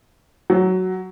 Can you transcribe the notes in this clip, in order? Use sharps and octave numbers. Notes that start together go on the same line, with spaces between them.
F#3